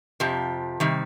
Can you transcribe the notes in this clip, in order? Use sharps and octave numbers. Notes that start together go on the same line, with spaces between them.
F2 C3 F3 G4
C3 D#3 G3